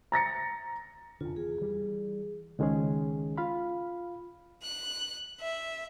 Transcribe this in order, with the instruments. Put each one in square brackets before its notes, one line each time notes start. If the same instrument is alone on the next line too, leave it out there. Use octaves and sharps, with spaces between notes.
[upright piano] A#5 A6 A#6 C#7
[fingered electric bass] F1 D3 [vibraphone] F4
[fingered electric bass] E2 [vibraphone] G#4
[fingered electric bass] E3 G3
[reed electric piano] C#2 D#3 G#3 C#4 G#4
F4 F5 B5
[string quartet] F#6
E5